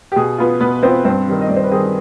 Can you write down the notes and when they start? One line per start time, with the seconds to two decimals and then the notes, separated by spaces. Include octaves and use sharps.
0.12 G4
0.16 B2 G#4
0.38 B3 F4
0.61 B2 B3 B4
0.83 B3 C4 F4 C5
1.05 G2 C4 C5
1.27 D#3 G3 C4
1.41 D#5
1.49 G2 D5
1.56 C5
1.64 B4
1.71 D#3 G3 C4 G#4